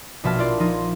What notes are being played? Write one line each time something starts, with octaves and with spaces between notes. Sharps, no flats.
A#1 B2 E5 A5 F6
E4 F4 D5 C6
F3 D#4 F4